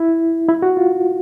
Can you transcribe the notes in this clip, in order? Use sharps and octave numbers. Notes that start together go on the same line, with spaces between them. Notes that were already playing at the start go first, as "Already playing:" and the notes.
Already playing: E4
E4
F#4
F4